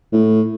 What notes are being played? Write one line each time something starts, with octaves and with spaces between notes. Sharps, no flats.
A2